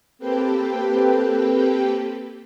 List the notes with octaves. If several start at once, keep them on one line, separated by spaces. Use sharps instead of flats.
A#3 C4 G4 A4 B4 G5